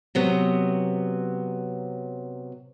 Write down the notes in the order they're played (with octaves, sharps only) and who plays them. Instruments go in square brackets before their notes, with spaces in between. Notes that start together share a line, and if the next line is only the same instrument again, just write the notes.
[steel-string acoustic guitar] C3 F#3 B3